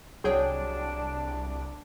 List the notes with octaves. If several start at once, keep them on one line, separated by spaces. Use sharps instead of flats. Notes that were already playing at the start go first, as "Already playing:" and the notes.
C2 F#3 D4 G#4 C#5 G5 C#6